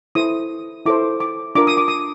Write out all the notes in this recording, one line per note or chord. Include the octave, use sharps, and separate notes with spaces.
E4 A4 C5 D#6
E4 A4 C5 D6
D6
D4 F4 A#4 D6
D#6
D6
D#6